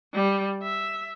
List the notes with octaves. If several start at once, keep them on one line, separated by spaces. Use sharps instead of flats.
G3
E5